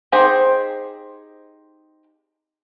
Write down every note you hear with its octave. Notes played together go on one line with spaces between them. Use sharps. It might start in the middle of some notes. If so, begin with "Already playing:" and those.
C4 D#4 G4 G#4 C5